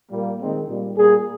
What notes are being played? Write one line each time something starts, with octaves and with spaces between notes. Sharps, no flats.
A#2 G3 A#3
D#3 G#3 C4
A#2 G3 A#3
A#2 G3 A#3 G#4